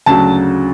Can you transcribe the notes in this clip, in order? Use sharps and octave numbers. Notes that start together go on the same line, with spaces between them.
D2 C#3 F#3 A5